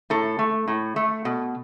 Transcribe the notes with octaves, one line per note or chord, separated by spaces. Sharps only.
A2 A4
A3
A2
A3
B2